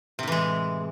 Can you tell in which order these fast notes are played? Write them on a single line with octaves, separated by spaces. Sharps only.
C3 A2 E3 G#3